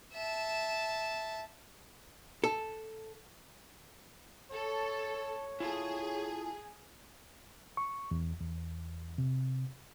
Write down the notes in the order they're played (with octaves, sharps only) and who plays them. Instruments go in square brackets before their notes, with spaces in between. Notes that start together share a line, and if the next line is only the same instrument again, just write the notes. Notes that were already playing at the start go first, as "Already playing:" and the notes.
[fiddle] E5 A5
[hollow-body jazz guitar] A4
[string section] A4 [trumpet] C#5
[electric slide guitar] E4 F4 A4 [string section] G#4
[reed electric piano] C#6
E2
E2
C3